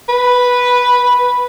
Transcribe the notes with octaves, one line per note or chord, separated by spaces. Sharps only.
B4